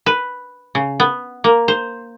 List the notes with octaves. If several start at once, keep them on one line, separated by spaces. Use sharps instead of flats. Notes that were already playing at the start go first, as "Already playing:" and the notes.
B4
C#3
B3
A#3
C5